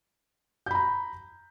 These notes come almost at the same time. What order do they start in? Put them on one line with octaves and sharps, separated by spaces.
G6 B5 A#5